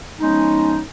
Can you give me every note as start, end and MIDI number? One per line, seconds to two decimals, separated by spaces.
0.21 0.80 53
0.21 0.80 56
0.21 0.80 59
0.21 0.80 61
0.21 0.80 63